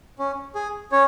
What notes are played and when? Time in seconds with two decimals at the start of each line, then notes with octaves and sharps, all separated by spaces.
0.19 C#4
0.55 G#4
0.92 C#4 C#5